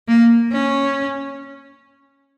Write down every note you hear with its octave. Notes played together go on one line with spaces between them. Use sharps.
A#3
C#4